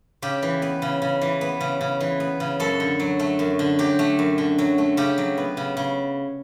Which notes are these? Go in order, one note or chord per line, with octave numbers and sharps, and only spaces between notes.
C#3 G4
E3
B3
C#3
C#3
E3
B3
C#3
C#3
E3
B3
C#3
F#2 A4
D3
F#3
A3
F#2
D3
F#3 G4
A3
F#2
D3
F#3
A3
C#3 G4
F#3
B3
C#3
C#3